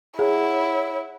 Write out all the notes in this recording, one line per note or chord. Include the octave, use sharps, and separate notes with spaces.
E4 G#4 C#5 F#5